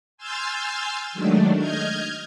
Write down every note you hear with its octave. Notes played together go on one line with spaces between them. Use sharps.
G#5 C6 E6 F6 G6 A6
D#3 F#3 G#3 A3 D4
D#5 F6 G6 G#6